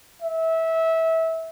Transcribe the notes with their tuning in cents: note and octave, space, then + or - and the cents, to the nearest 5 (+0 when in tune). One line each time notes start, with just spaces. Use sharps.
E5 -20